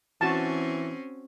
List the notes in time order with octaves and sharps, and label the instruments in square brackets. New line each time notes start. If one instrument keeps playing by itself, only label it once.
[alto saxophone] E3 [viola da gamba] C4 C#4 [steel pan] F#4 A5